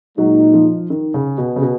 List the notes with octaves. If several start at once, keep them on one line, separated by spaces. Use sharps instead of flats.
A#2 F#3 G#3 D#4
F3
D#3
C#3
B2
C#3
B2